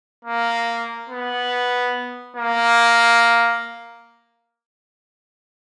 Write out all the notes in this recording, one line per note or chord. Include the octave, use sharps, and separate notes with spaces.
A#3
B3
A#3